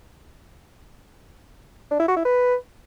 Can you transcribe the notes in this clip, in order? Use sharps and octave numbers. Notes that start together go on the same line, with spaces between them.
D4
E4
F#4
E4
B4